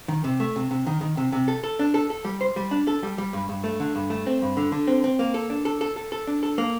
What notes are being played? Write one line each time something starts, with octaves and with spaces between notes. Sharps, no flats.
D#3
C3
A3
C3
C3
D#3
D#3
C3
C3
A4
A4
D4
A4
A4
G3
C5
G3
D4
A4
G3
G3
G2
G2
A3
D3
G2
A3
C4
G2
D3
D3
C4
C4
A#3
A4
D4
A4
A4
A4
A4
D4
A4
A#3